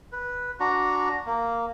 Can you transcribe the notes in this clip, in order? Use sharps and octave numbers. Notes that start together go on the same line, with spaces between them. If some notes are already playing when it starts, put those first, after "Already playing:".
B4
D4 F#4 A#5
A#3